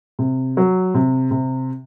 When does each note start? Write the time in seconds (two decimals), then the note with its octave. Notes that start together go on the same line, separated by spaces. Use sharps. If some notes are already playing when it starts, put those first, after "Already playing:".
0.19 C3
0.57 F#3
0.94 C3
1.31 C3